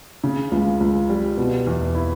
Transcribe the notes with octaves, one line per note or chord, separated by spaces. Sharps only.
C#3
C#2
C#2
G3
B2
E2
E4